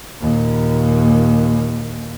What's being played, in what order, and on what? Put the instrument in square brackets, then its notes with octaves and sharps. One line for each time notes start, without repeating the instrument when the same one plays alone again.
[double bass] D#2 A#2